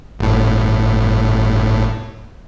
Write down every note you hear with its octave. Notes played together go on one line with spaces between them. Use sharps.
G1 A2